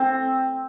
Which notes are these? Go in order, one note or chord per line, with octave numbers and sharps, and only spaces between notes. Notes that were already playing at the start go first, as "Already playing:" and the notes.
Already playing: C4